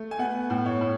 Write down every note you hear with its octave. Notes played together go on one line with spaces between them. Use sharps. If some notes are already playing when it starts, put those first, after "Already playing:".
Already playing: A3
G#5
B3 F#5
A2
C#5
A2